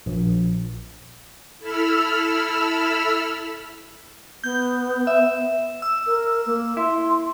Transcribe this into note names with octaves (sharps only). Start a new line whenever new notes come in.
A#1
E4 A4 B5 E6 F6
B3 G6
E5
E6
A#4
A#3
E4 C6